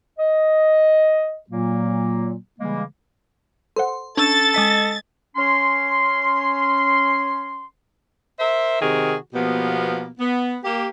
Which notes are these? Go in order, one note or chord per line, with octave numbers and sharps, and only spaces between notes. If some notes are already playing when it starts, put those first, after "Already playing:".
D#5
A#2 F#3 A#3
C#3 E3 G3 G#3 A#3
A4 C5 F#5 C6
C#4 D4 A4 E6 A6 E7
G#3 D#5 A5 D6 B6
C#4 C6
A#4 C5 E5
C3 D#3 F#4 G#4 A#4
B2 F3 A#3 B3 G4
B3
A#3 G4